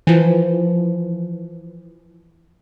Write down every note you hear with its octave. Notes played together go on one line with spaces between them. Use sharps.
E3 F3